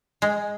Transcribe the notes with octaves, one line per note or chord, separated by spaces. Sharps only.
G#3